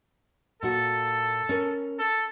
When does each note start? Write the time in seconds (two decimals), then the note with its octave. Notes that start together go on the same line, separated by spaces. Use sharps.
0.63 A#2 F#4 A4
1.49 C#4 A#4
1.99 A4